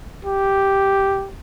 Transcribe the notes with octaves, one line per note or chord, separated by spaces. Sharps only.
G4